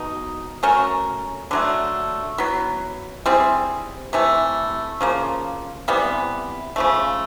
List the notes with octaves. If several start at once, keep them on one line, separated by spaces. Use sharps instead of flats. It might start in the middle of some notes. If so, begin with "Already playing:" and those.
Already playing: B2 D#4
A3 C#4 F#4 A#4
D3 F#3 A3
F#3 B3 E4
G3 C4 E4 G#4
C3 E3 A3
C#3 F3 A#3
C3 E3 G3 B3
C#3 F3 A3